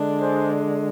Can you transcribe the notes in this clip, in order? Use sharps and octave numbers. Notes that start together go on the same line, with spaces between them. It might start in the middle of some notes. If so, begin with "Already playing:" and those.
Already playing: D3 G#3 D4
G#4 C5